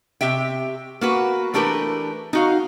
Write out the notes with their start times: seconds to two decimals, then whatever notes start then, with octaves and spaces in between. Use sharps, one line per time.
0.21 C3 G4 E5 G5
1.01 A#3 F#4 B4
1.54 E3 A3 D4 G4 A#4 B4
2.33 D#4 F#4 F5